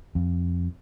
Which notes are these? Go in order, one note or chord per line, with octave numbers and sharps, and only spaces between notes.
F2